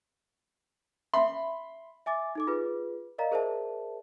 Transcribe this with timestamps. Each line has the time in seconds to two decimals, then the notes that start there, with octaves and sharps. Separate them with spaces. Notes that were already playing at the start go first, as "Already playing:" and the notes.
1.14 E5 B5 C6
2.06 E5 G#5 D6 A6
2.35 D#4 A4 D6
2.47 F4 G#4 B4
3.18 A#4 D5 D#5 F5 A#5
3.32 G#4 A#4 C5 D5 E5 A5